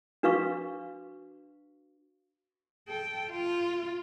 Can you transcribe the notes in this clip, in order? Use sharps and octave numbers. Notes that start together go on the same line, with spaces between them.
D4 F#4 B4 F5 C#6
A4 G5
F4